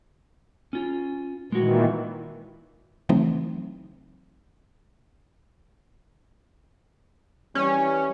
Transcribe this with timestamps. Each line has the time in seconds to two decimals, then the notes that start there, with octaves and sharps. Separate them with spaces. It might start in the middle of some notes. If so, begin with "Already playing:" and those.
0.73 C#4 F4
1.52 A#2 D#3 E3 G#3 F#4
3.09 C#3 E3 F#3 A3 C4 D#4
7.55 E3 G3 C#4